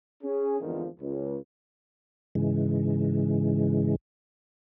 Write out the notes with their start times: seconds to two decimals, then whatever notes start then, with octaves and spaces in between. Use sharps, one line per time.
0.23 C#4 G#4
0.60 G#1 E2 D3 D#3 F3
1.00 C#2
2.35 G#2 C#3 E3 G#3